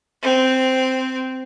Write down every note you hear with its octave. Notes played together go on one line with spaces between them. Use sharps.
C4